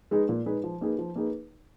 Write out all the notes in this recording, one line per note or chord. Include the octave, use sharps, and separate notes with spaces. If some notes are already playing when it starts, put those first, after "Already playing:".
G#3 D#4 G#4 B4
A#2
G#3 D#4 G#4 B4
F3
A#3 D#4 G#4 B4
F3
A#3 D#4 G#4 B4